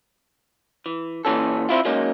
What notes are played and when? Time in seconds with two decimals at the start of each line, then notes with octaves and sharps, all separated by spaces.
0.86 E3
1.25 A#2 E3 C#4 A4
1.69 C4 E4 F4
1.85 F#3 G#3 A#3 C#4 D#4